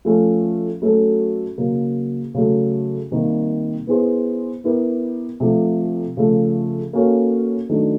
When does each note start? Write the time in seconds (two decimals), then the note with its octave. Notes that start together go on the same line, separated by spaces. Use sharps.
0.05 F3 A3 C#4
0.82 F#3 A3 C#4 F#4 A4
1.58 C#3 F#3 A#3
2.34 C#3 F#3 A3
3.11 C3 D#3 G3 A#3
3.87 B3 E4 G#4 C5
4.64 B3 E4 G4 A#4
5.40 C3 F3 A3
6.17 C#3 F3 A3
6.93 A#3 C#4 F#4 A4 C#5
7.69 D#3 F#3 A3 D4